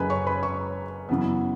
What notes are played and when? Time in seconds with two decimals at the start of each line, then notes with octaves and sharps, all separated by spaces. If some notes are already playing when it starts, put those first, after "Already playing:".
Already playing: F#1 F#2 C#3 G#4 B4 G#5 B5
0.10 C#5 C#6
0.27 B4 B5
0.43 C#5 C#6
1.09 F#2 C#3 E3 B3